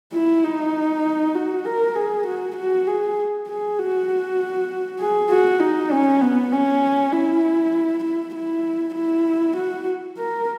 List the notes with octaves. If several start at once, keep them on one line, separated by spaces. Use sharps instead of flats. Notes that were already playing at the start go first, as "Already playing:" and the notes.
E4
D#4
F#4
A#4
G#4
F#4
F#4
G#4
G#4
F#4
G#4
F#4
D#4
C#4
B3
C#4
E4
E4
E4
E4
F#4
A#4